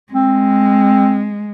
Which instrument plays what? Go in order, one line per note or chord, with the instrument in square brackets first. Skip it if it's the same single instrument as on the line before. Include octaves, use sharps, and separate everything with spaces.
[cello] G#3 [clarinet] C4